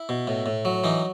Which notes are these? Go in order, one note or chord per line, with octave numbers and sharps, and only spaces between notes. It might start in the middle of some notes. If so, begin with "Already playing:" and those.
Already playing: E4
B2
A2
A2
F#3
E3 D#4